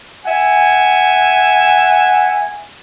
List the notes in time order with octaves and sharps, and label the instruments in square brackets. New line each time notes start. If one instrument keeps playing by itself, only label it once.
[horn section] E5 F#5 G#5